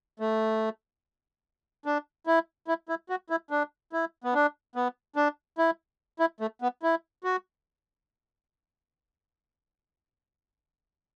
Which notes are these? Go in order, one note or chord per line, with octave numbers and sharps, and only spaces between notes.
A3
D4
E4
E4
E4
F#4
E4
D4
E4
B3
D4
B3
D4
E4
E4
A3
B3
E4
F#4